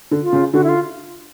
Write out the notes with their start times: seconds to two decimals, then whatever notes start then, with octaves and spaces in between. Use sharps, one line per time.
0.11 D3
0.23 F4
0.33 C#3
0.53 D3 F#4
0.64 E4
0.69 F4